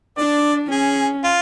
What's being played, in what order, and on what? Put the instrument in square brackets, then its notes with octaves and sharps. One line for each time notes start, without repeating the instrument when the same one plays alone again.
[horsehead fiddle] D4 [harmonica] D5
[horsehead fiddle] C#4 [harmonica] G#4
[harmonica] F4